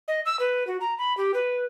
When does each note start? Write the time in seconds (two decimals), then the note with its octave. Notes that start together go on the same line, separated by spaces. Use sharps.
0.08 D#5
0.26 E6
0.40 B4
0.67 F#4
0.81 A#5
0.98 B5
1.17 G4
1.34 B4